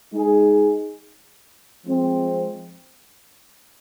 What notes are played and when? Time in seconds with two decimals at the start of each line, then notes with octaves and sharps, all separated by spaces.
0.11 G#3 D#4 G#4
1.86 F3 G#3 C4